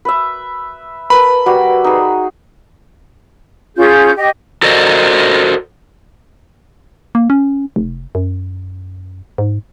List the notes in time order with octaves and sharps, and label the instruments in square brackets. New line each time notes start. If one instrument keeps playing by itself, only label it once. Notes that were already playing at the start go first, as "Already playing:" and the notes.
[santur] B4 E5
[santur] A#4 A5 [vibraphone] B4 [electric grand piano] B5
[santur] G3 F#4 D5
D#4 G#4
[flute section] C#4 F4 G6 [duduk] G#4
[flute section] G4 D#5
[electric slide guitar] F#4 A4 A#4 C5 D5 D#5
[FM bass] A#3
C#4
F1
F#2
G#2